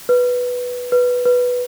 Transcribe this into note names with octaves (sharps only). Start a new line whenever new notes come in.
B4
B4
B4